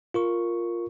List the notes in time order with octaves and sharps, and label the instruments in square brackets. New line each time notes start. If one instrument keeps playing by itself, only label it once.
[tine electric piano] F4 A#4 C#6